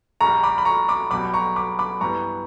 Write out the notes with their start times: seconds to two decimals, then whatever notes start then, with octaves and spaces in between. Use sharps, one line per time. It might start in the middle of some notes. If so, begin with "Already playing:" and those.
0.21 A#1 A#2 G3 A#5 C#6
0.43 B5 D6
0.58 B5
0.65 A#5 C#6
0.89 B5 D6
1.11 B1 B2 G3 B5 D6
1.34 A#5 C#6
1.56 B5 D6
1.79 B5 D6
2.01 G2 E3 G3 B3 A#5 C#6